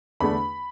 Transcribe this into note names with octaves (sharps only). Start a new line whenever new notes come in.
E2 D3 A3 D4 B5